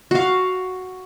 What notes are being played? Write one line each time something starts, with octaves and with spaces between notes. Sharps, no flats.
F#4 F5